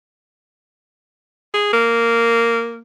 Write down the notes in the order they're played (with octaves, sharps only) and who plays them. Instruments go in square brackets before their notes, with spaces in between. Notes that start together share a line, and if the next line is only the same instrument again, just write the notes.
[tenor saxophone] G#4
A#3